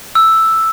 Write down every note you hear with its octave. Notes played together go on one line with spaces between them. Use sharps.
E6